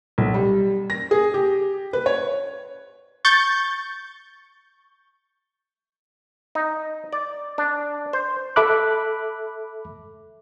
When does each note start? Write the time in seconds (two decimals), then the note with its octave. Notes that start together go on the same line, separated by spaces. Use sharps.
0.18 B1
0.34 G3
0.90 A#6
1.11 G#4
1.34 G4
1.93 B4
2.06 C#5
3.25 C#6 G6 A6
6.55 D#4
7.13 D5
7.58 D4
8.13 C5
8.56 A4 E5 B5 D6 F#6